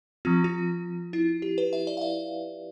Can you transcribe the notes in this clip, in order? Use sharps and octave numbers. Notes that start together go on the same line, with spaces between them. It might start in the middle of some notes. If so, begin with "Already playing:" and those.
F3 C4 F4
F4
E4
G4
B4
E5
D5
F5
E5